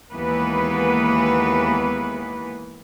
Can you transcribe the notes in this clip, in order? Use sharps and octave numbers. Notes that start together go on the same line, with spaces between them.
D#2 E3 G#3 B3 B4